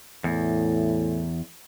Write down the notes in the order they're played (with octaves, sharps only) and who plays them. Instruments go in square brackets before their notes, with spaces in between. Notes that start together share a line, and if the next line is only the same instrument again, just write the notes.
[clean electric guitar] E2 [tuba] A2